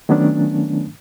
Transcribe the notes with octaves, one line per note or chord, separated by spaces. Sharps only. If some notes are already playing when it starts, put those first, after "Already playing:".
D#3 F#3 A3 B3 C#4 D4